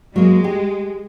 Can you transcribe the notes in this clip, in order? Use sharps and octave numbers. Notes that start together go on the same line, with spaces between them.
F#3 G#3 A#3
G4